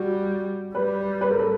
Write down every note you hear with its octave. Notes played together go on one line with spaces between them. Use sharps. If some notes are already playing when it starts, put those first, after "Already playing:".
Already playing: G3 F#4
G3 B4
B4
A#4
A4